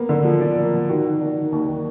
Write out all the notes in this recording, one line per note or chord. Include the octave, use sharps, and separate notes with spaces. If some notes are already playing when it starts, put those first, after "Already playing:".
Already playing: A#3 B3
D3
F3
F3 D5
A#3
A#4
A#3
D#3 F#4
D#3
D4
D#3
D#2
D#3